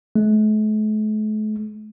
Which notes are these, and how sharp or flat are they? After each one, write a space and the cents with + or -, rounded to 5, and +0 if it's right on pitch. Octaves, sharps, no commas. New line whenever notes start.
A3 -45